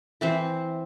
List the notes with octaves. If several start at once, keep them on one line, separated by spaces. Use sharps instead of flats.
E3 C4 C5